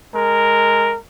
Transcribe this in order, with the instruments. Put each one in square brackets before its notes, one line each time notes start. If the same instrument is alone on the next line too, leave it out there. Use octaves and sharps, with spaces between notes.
[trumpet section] G#3 A#4